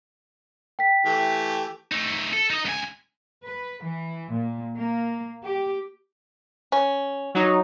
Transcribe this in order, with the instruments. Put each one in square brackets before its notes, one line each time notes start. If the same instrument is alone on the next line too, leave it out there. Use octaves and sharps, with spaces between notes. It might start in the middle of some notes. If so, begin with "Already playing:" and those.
[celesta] G5 B6
[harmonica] E3 A3 G4
[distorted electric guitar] A3 D#4
A4
D#4 D#5
C#2 G#5
[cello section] B4
E3
A#2
A#3
G4
[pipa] C#4
[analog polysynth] F#3 D#4